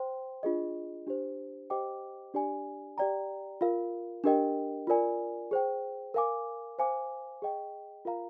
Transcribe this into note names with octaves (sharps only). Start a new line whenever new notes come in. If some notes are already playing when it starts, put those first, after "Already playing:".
Already playing: C5 G5 C6
D4 F4 G#4 D#5
D4 G4 C5
G4 C5 D#5 G5 D6
D4 G4 D5 G#5
G4 D5 G5 A#5
F4 A#4 F5
D4 G4 A#4 D#5 G5
F4 A#4 D5 G#5
G#4 C5 G5
A#4 F5 G#5 D6
C5 F5 G#5 D6
G#4 D#5 G5
F4 A#4 F5 A#5